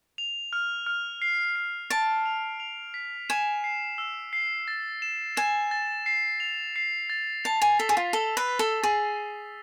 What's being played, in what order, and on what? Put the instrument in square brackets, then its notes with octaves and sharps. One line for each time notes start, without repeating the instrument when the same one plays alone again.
[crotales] F7
F6
F6
C7
C7
[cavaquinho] A5 [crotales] D7
[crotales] F7
F7
B6
[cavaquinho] G#5 [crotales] E7
[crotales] C7
E6
C7
A6
E7
[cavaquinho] G#5 [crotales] E7
[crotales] A6
C7
F7
C7
A6
[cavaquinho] A5 [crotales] F7
[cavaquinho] G#5
[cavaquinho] A4 [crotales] B6
[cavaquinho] G#4
F4
[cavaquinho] A4 [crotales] E6
[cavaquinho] B4
[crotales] B6
[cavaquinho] A4
[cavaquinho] G#4 [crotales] A6
[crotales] A6